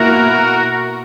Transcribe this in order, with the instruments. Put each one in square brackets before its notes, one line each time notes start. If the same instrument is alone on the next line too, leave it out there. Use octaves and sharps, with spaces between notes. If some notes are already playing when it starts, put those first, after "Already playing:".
Already playing: [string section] B2 A#3 E4 [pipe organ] F#4 A#4